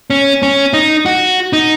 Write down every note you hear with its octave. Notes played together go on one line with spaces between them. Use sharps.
C#4
C#4
D#4
F#4
D#4